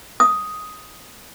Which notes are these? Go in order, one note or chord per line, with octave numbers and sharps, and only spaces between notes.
D#6